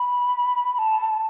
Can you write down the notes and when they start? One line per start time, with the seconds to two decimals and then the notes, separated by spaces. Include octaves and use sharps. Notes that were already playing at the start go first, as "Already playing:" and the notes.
Already playing: B5
0.75 B5
0.78 A5